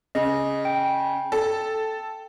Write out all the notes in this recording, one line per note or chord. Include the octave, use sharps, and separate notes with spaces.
C#3 D#5
G5
A4